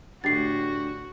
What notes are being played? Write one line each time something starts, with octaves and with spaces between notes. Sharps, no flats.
A2 D3 F#4 G4 A6 C7